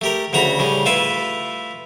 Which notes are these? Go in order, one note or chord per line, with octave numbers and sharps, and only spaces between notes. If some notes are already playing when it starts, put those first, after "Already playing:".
A3 G4 A#4
D2 C#3 F#4 A#5 B5
A2 C#3 G3 C#4
A3 E4 F4 B4 E5